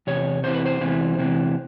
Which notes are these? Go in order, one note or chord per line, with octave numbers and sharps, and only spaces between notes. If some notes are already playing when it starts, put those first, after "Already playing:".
E2 C3 C#5
E2 C3 E3 C5
B4
C5
E2 C3 E3
E2 C3 E3